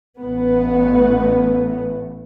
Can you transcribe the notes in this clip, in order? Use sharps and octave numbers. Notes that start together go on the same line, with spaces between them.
A1 A2 B3